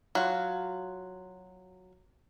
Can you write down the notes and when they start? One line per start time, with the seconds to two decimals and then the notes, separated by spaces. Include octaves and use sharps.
0.15 F#3 F4